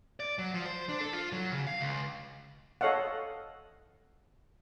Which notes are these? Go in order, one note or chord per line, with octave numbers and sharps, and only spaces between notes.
D5
F#3
F3
C5
D4
A4
F4
F#3
C#3
F5
C#2
A4 C#5 D#5 F5 F#5